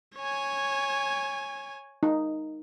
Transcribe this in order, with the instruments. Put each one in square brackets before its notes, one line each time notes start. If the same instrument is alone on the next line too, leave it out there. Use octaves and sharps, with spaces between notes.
[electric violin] C#5 G#5
[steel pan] D#4